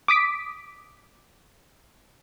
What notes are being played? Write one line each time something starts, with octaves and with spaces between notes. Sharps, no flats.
D6 D#6 B6 D7